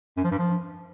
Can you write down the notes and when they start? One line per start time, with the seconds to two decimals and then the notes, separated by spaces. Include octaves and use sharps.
0.17 F#2
0.24 F3
0.31 G2
0.38 F3